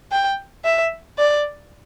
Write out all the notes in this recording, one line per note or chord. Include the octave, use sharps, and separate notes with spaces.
G5
E5
D5